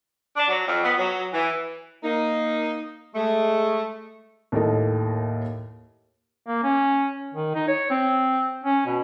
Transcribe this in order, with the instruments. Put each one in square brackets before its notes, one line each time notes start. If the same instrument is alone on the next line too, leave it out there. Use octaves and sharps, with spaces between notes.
[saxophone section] D4
F#3
F2
B3
F#3
E3
A#3 D#4
G#3 A3
[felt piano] D#2 A2 A4 A#4 D#5
[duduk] A#3
C#4
D#3
D#4
C#5
C4
C#4
B2